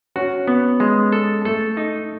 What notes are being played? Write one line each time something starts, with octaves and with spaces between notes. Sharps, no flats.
C#4 F#4
B3
G#3
A4
A3 A4
D#4